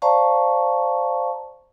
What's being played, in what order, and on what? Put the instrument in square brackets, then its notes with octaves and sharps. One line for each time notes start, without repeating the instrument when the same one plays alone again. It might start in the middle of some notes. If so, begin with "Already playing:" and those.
[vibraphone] C5 D5 F5 A5 A#5 C#6